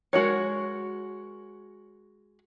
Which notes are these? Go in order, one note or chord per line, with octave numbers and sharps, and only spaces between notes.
G#3 F#4 A#4 C#5